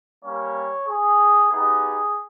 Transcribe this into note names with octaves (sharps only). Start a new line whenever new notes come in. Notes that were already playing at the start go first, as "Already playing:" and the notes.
G3 A#3 C#4 C#5
G#4
B3 D#4 G4 G#4